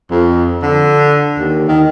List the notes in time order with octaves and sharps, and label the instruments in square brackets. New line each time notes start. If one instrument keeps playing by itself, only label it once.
[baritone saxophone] F2
D3
D#2
D#3